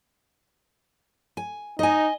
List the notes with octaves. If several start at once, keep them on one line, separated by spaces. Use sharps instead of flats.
G#5
D#4 D#5 G#5